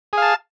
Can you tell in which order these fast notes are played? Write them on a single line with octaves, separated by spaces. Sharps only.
G#4 F5 A5